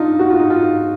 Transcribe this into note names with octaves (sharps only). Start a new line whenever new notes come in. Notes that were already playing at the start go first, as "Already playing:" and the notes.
Already playing: D4 D#4 F4
F#4
F4
D#4
F4